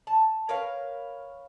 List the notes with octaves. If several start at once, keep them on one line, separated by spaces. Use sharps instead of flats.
A5
A#4 B4 C#5 F5